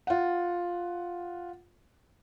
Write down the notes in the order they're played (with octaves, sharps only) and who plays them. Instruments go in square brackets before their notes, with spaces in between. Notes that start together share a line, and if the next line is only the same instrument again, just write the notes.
[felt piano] F4 F#5